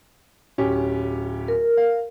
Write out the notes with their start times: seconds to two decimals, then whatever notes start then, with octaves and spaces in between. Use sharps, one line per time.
0.58 D1 C#4 G4
1.48 A#4
1.77 F5